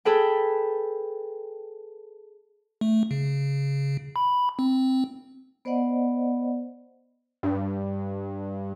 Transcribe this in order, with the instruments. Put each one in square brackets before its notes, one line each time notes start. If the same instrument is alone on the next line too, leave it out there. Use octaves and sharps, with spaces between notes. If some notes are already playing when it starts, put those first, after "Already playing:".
[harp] G#4 A4 B4 G5
[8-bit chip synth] A3
C#3
B5
C4
[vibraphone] B3 C5 D5 D#5 F#5
[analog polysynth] G2